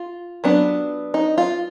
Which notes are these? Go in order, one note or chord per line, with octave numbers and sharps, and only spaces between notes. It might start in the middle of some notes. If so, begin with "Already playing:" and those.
Already playing: F4
F#3 B3 D4
D#4
F4